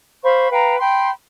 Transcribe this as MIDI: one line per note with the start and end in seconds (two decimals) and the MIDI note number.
0.23 0.51 72
0.23 0.51 77
0.23 0.51 83
0.23 0.51 85
0.52 0.78 71
0.52 0.78 77
0.52 0.78 79
0.52 0.78 82
0.79 1.11 79
0.79 1.11 83
0.79 1.11 84